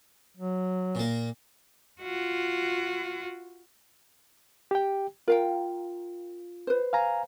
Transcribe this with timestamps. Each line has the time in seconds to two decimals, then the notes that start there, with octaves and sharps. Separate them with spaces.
0.37 F#3
0.95 A#2 A#3
2.01 F4 F#4
4.71 G4 G5
5.28 F4 A#4 F5 G5
6.67 B4 C5
6.93 F5 G#5 A#5